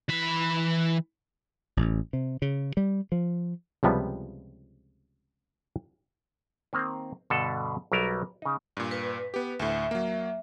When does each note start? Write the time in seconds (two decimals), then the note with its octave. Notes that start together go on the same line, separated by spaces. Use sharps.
0.09 E3 B5
1.77 A1
2.13 C3
2.42 C#3
2.77 G3
3.12 F3
3.83 C#2 C3 F3 G3 B3
6.73 D#3 A#3 C4
7.30 G2 B2 D3 A4
7.92 B1 F#3 G3 A#4
8.42 C#3 D#4
8.77 G2 A#2
8.91 B4
9.34 B3 G4
9.60 D2 A2 E5
9.91 F#3 A#3